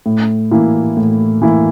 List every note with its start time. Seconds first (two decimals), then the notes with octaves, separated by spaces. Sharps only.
0.06 A2
0.51 E3 A#3 E4
0.97 A2
1.42 E3 A#3 E4